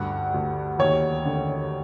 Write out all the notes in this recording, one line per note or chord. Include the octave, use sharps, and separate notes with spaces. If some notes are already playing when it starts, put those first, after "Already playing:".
Already playing: D2 G2 F#5
D2
D#2 C#5
D3